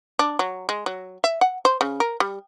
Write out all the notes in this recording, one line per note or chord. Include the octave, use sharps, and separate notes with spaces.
D4
F#3
G#3
F#3
E5
F#5
C5
C#3
A#4
G3